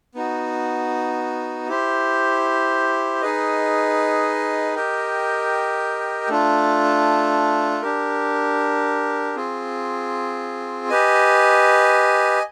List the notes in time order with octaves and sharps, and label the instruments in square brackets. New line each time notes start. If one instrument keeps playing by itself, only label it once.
[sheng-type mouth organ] B3 D#4 F#4
E4 G4 C5
D#4 G#4 B4 D#5
G4 A#4 D#5 G5
A3 D4 F4
D4 G4 A#4
C4 F4 G#4
G4 B4 D#5 G#5